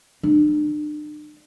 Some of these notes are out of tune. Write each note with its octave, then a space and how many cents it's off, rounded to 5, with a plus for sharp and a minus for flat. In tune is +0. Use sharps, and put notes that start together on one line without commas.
D4 +40